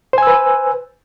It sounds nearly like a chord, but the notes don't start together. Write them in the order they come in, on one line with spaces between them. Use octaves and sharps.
C5 G#5 E6 B4